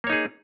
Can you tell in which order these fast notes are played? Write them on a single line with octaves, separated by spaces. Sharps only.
A#3 C#5 D#4 G#4